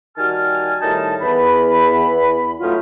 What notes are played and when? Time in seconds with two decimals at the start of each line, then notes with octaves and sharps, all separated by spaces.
0.17 D#3 G3 F#4 G#5 A5 F6
0.81 A2 D#3 G3 D#4 A5
1.22 E2 B5
2.61 A2 F#3 A3 C#4 D#4 F4